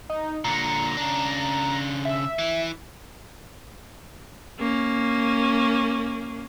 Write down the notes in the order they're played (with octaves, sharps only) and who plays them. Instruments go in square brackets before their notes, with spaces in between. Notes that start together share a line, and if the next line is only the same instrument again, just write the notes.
[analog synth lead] D#4
[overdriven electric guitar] A#2 D3 [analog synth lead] A#5
[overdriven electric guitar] C#3 D4
[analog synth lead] E5
[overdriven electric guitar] E3
[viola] A#3 C#4